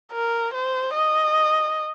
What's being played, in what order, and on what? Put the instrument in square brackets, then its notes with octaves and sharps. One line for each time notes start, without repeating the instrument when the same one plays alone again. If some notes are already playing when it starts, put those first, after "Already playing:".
[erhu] A#4
C5
D#5